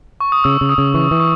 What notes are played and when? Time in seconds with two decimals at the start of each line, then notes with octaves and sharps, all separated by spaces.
0.20 C#6
0.32 D#6
0.44 C#3 E6
0.61 C#3
0.69 D#6
0.78 C#3
0.94 E3 C#6
1.11 E3
1.20 C#6